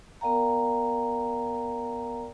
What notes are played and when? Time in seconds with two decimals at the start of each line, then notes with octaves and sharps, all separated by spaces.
0.21 B3 A#4 D5 F5 G5 A#5